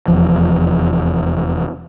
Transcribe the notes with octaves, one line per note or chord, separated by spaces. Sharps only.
F1 E2 F3